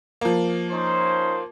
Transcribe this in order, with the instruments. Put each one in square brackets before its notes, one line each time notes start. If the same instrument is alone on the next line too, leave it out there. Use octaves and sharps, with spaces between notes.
[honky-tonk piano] F3 A#3
[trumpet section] C#4 D#4 C5